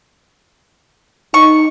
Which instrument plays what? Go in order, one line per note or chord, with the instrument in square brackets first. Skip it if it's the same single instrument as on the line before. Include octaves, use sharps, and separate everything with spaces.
[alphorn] D#4 [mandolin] C#6